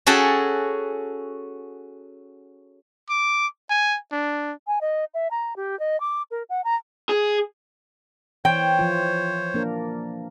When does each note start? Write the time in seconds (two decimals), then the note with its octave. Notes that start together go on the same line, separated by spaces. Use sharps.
0.06 C#4 F#4 G#4 A4 G5 A5
3.09 D6
3.70 G#5
4.12 D4
4.67 G#5
4.81 D#5
5.14 E5
5.31 A#5
5.56 G4
5.80 D#5
6.00 D6
6.31 A#4
6.49 F#5
6.64 A#5
7.09 G#4
8.45 E3 C5 C#5 G5
8.79 F3 F4
9.54 A#3 D4 A#4